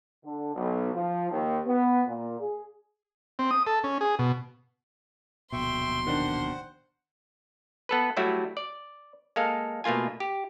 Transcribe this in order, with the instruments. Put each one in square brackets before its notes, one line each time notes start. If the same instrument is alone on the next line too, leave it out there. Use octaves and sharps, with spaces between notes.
[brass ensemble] D3
B1
F3
D#2
B3
A#2
G#4
[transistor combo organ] C4
D#6
A4
C#4
G#4
B2
[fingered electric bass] D1 A#1 B2 [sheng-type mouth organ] E5 G5 C#6 [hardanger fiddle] C6
[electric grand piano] D#3 D4 [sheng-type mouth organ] C5 F#5
[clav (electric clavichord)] B3 A4 B4
F#3 G3 A3 E4 F#4
D5
G#3 A#3 A4 F5
B2 A3 A#3 F4 G#5
G4